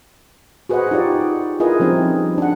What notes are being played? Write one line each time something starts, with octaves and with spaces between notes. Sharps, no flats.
F#4 G#4 B4 C5 D#5 F#5
D#4 F4 G4 D5
E4 F4 G#4 A#4 B4 D#5
F3 G3 C4 C#4 D#4
D4 F#5